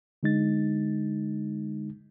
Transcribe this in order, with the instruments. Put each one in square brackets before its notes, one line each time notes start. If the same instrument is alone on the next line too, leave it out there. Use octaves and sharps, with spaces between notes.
[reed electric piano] D3 G#3 D#4 A6